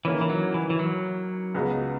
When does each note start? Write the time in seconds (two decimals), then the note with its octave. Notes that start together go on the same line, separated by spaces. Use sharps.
0.05 D#3 E3 A#3 C#4 E4
0.21 E3
0.30 F#3
0.54 E3
0.70 E3
0.79 F#3
1.54 C#2 C#3 G#3 B3 F#4